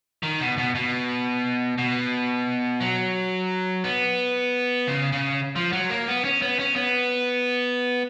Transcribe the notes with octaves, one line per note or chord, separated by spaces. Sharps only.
D#3
B2
B2
B2
B2
F#3
B3
C#3
C#3
F3
F#3
A#3
B3
C#4
B3
C#4
B3